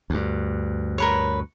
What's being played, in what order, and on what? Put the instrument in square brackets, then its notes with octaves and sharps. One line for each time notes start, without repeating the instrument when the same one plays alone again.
[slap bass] D2 G2
[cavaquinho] A#4 B4 C#5